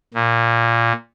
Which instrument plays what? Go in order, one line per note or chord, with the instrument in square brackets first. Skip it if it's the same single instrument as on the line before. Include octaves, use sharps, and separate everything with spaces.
[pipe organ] A#2